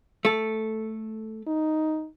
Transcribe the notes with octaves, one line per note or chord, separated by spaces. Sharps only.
A3 A4
D#4